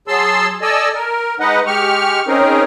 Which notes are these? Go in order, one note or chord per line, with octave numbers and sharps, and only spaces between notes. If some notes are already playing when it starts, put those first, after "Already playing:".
F#3 G#4 A5 C6 E6
A4 D5 D#5 G#5 E6
A#4
G#3 D#4 B4 D#5 F#5
G#3 G4 C#6 F6
C4 C#4 D#4 G#4 A#4